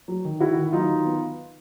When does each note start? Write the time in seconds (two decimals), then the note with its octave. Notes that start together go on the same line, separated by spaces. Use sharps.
0.08 F#3
0.25 D#3
0.40 D#3 E4 F#4
0.57 D#3
0.73 F#3 D#4 F4
0.89 D#3
1.05 B3